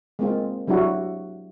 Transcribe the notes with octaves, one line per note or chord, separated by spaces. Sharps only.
G#3 A#3 C4 F4
F#3 G3 D4 E4 F#4